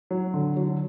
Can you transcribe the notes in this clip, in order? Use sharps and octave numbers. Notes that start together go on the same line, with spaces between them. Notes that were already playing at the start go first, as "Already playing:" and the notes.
F#3
D3
F#3